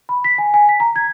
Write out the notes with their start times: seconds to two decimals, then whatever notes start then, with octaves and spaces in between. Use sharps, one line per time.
0.09 B5
0.24 B6
0.38 G#5
0.54 G#5
0.69 B6
0.80 A#5
0.96 G#6